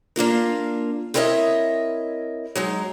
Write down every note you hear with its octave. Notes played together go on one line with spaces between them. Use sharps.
A#3 D4 F4 A#4
C4 E4 A#4 C#5 D#5 E5
F#3 G#3 D#4